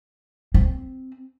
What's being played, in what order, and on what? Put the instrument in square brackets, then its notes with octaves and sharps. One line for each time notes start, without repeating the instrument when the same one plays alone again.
[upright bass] C4